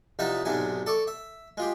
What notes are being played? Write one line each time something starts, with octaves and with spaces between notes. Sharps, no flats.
C2 F3 D#4 E5 F#5 A5
B1 G#2 C3 D4 G#5
A4 D5 C#6
E5
G#3 F4 G4